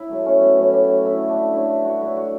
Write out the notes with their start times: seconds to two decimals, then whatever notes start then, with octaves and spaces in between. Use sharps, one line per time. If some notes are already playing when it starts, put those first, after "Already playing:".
Already playing: E4
0.09 B2 F#3 A3
0.26 C#4
0.41 B3
0.57 A2 F#3 A3 C#4
0.73 G4
0.89 F#4
1.05 D3 A3 E4
1.29 D4
1.53 B2 F#3 A3 E4
1.69 F#4
1.85 F#4
2.01 D3 F#3 A3 E4
2.17 F#4